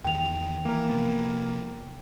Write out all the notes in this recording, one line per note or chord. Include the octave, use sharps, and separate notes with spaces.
E2 D#3 G5 F7
E3 A#3 A#4
C3 F3 B3